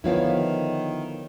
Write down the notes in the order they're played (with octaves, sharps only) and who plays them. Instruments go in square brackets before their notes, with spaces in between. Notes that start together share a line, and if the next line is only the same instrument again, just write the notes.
[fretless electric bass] D3 F3 B3 [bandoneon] D#3 [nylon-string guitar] E4 C#5 F5